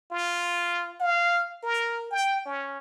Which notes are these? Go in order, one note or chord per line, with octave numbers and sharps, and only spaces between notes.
F4
F5
A#4
G5
C#4